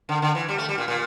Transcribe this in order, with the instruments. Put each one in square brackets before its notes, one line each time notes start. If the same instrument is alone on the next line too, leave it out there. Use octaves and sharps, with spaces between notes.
[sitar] D3
D3
E3
G3
A3
G3
A#2
A#2